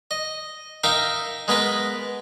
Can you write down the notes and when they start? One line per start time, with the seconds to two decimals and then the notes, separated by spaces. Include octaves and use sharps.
0.11 D#5
0.84 D#4 A#4 E5 F5 G5
1.48 G#3 B3 A#4 B4